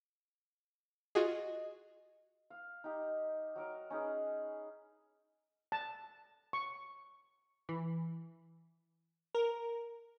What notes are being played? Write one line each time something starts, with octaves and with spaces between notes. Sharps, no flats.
F4 F#4 G#4 D#5
F5
D#4 G4
F#3 A#4 D6
C#4 D#4 G#4 B4
A5
C#6
E3
A#4